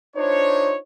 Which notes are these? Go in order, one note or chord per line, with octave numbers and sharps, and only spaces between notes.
D4 D#4 F4 C5 C#5